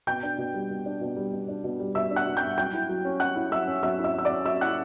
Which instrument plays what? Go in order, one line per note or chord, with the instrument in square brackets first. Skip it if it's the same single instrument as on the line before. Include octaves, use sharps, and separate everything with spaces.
[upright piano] B2 G5 G6
D4
B2
G3
B2
D4
B2
G3
B2
D4
B2
G3
B2 E5 E6
D4
F#5 F#6
B2
G5 G6
G3
F#3 G5 G6
E4
F#3
C#4
F#3 F#5 F#6
E4
F#3 E5 E6
C#4
F#3 E5 E6
E4
E5 E6
F#3 E6
D5 D6
C#4
F#3 E5 E6
E4 F#5 F#6